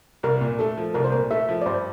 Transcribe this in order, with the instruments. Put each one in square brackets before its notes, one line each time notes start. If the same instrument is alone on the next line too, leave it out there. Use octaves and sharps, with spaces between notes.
[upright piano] C2 [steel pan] A#4
[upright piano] A#2
[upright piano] A3 [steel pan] A4
[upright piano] F3
[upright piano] C2 [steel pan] A#4
[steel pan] C5
[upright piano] A#2 [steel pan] A#4
[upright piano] A3 [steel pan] E5
[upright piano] F3
[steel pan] D5
[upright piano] G2 [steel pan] C5